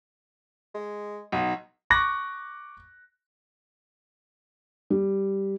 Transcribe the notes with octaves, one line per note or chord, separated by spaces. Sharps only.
G#3
B1 D#4
C#6 D6 F#6 A#6
G3